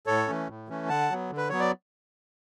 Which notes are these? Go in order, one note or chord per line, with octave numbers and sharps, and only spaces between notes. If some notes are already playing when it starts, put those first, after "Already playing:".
A2 A4 C#5
E3 A3 C#4
A2
E3 A3 C#4
D3 F#5 A5
F#3 B3
D3
B4
F#3 B3 C#5
D5